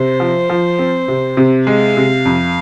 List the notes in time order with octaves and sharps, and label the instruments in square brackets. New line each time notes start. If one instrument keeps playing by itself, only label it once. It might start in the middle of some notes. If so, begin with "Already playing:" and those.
Already playing: [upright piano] C3 [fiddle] C5
[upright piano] F3
F3
C4
C3
C3
[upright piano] G#3 [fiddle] F5
[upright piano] C3
F2